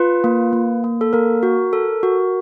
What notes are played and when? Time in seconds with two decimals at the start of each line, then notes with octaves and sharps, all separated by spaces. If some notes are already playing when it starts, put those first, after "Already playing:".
Already playing: F4 B4
0.24 A#3
0.53 A#3
0.84 A#3
1.01 A4
1.13 A#3 A#4
1.43 F#4
1.73 A4
2.03 F#4